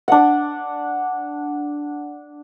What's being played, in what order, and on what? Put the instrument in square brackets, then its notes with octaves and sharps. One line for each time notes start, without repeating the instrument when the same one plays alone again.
[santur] D4 F#5